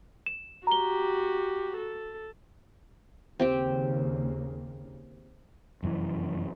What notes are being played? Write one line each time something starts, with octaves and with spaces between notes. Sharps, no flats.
E7
F#4 G4 A#5 G7
A4
D#2 C#3 A#3 C4 G4 G5
F1 F#2 A#2 E3